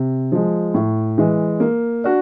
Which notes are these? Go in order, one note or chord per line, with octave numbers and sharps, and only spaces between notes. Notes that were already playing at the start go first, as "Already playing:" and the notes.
Already playing: C3
F3 G#3
A2
E3 G#3
A#3
D4 F#4